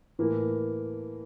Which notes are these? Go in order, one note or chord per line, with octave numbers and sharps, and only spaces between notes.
A2 E3 A#3